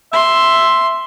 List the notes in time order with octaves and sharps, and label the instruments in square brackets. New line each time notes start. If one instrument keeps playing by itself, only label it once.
[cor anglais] E5 [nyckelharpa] C6